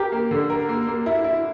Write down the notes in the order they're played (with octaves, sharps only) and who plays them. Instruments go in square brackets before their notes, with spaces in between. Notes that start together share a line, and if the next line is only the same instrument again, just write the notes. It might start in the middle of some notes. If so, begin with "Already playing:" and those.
Already playing: [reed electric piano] G4 [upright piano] A#4
[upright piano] A#3
D3
A#4
A#3
A#3
E4
E4